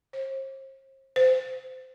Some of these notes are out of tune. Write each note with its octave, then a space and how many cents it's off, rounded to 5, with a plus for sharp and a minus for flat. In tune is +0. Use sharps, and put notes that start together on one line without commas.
C5 +40
C5 -25